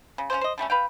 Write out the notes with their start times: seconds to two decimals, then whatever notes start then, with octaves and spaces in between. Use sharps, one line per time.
0.18 C#3
0.30 C#4 D4 F4 C5
0.41 C5 D#5
0.58 D3 G3 A3 C#4
0.70 B4 F5 G5